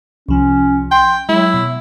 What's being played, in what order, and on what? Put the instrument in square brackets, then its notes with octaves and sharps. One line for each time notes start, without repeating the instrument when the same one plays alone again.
[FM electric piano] C2 F3 [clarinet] C#4
[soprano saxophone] G5 [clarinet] C6
[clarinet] F#3 [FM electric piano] G#3 [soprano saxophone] E4
[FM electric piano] B2